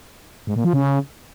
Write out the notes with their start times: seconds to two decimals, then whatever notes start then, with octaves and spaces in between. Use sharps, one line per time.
0.47 G#2
0.56 A#2
0.65 F3
0.73 C#3